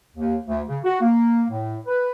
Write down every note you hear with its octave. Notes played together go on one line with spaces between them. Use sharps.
D#2
D2
C#3
F#4
A#3
A2
B4